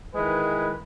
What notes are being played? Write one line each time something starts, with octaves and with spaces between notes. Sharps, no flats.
D#3 E3 G#3 B4